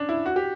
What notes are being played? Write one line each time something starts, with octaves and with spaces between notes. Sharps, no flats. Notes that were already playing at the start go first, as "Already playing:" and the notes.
Already playing: C#4 D4
E4
F#4
G4